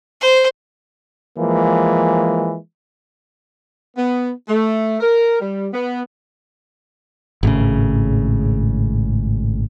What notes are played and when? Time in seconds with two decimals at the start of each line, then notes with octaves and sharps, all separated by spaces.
0.21 C5
1.38 E3 F3 G#3 A#3
3.97 B3
4.49 A3
5.01 A#4
5.40 G3
5.73 B3
7.43 G#1 A2 C#3